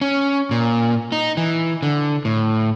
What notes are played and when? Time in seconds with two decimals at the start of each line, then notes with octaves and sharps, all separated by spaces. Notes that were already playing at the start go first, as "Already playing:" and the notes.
0.01 C#4
0.51 A#2
1.12 D#4
1.37 E3
1.83 D3
2.25 A2